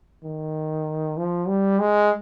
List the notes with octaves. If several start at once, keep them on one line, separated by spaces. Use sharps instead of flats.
D#3
F3
G3
G#3